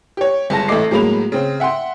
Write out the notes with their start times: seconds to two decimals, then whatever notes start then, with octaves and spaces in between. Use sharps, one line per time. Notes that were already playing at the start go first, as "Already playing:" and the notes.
0.17 G4 C#5
0.50 G1 G#3 A5 A#6
0.68 A1 A3 A4 D#5 D6 C7
0.91 A2 F#3 G#3 A#3 B5 F7
1.32 C#3 C4
1.60 E5 F#5 G5 C6